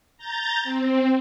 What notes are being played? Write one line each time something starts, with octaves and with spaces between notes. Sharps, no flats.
A#5 G6 A6
C4